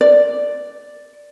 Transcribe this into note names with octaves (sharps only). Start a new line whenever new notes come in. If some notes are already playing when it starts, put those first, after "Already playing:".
D5